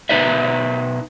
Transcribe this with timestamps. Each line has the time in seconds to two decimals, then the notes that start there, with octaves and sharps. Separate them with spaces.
0.09 B2 D#4 B4 D5 E5